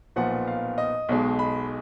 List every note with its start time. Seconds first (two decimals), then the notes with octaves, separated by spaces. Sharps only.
0.16 B1 A#2 F3 B3 F#5
0.48 F5
0.78 D#5
1.09 B1 B2 G#3
1.39 B5